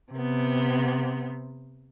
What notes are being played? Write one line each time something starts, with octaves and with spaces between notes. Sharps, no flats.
C3 B3